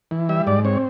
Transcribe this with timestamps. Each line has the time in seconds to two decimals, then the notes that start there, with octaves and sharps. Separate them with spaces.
0.11 E3
0.29 G3 E5
0.47 G#2 D5
0.65 C4 C#5